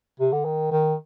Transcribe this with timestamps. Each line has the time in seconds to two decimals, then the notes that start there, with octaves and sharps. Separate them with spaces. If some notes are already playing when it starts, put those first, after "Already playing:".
0.20 C3
0.32 D3
0.45 D#3
0.71 D#3